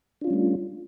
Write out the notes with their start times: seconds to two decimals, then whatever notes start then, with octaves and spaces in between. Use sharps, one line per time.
0.21 D4
0.24 F4
0.27 C#4
0.30 G3
0.33 A3